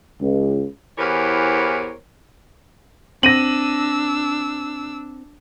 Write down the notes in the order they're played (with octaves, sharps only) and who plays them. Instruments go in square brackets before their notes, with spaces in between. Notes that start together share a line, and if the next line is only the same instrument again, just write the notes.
[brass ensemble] C#2
[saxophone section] E2 E3 G4 A#4 C5 C#5
[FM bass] C4 [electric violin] D4 E6 [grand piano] A#6 D#7 F#7